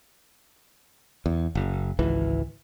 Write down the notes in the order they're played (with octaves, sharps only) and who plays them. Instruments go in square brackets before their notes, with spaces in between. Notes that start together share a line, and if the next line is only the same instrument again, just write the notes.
[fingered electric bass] E2
F#1
G#1 C#2 E3